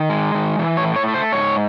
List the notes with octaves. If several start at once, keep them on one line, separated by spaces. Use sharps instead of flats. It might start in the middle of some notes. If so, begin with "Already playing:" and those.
Already playing: D#3
G#3
D#3
E3
C#5
A2
C#5
A3
C5
G#2 C#5